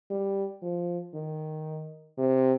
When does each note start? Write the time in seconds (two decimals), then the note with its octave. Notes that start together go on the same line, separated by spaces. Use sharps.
0.10 G3
0.62 F3
1.14 D#3
2.18 C3